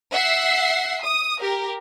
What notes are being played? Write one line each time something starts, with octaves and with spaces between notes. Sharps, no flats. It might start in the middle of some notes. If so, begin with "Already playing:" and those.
E5 F#5 C7
D#6
G4 A#4